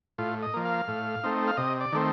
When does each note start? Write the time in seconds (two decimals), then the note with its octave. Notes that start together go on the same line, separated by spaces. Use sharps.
0.18 A2 F4
0.42 D#5
0.54 F3 A#3
0.65 F5
0.88 A2
1.24 A3 C4 D#4
1.47 F5
1.57 C3 D#5
1.81 D5
1.92 D#3 A3 C4